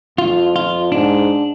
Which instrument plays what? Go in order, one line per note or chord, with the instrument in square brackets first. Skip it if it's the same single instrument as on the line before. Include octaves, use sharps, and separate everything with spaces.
[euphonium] F2 [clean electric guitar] F4
[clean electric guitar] F4
[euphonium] G#2 [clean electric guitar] D4